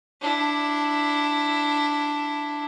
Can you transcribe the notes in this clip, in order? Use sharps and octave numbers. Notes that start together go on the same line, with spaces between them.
D4 E4